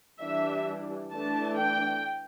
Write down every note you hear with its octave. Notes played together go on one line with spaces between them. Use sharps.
E3 G3 D4 E5
E3 A3 D4 A5
G5